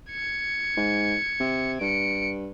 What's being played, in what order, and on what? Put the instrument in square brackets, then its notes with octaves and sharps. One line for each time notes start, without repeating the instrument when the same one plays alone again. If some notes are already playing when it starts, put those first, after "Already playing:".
[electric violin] G#6 C#7
[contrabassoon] G#2
C3
[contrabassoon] G2 [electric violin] C#7 D7